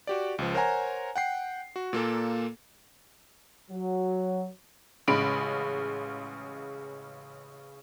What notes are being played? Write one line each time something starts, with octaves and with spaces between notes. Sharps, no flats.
F#4 G4 D5
C#2 F3
A#4 C5 C#5 F#5 G#5 A#5
F#5 G5 C7
F#4
A#2 A#3 A4
F#3
A1 C#3 G#3 B5 D7